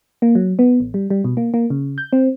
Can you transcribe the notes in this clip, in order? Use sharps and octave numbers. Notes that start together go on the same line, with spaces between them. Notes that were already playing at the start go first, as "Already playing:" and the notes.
A#3
F#3
B3
A1
G3
G3
B2
A#3
A#3
C#3
G6
C4